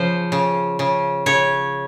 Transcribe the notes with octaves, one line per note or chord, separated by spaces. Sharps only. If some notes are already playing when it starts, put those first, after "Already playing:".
Already playing: C#3 F3 C5
C#3
C#3
C#3 C#5